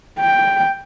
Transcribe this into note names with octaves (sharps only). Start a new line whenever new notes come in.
G5